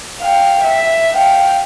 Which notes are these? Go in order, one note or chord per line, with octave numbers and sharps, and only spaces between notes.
F5 G5
E5
F5 G5